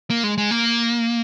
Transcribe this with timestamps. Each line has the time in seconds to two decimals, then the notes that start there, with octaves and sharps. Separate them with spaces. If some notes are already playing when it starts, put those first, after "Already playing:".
0.10 A#3
0.24 G#3
0.38 G#3
0.51 A#3